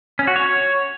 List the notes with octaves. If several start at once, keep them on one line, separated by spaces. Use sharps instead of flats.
C#4
F#4
C#5